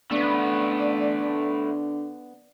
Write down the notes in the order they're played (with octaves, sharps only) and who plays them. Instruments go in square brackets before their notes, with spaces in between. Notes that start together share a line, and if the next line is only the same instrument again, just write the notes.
[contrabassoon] D3 [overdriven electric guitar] A3 B4 [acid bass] B3 [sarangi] D5